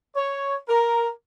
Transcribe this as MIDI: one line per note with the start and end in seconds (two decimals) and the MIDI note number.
0.16 0.55 73
0.69 1.08 70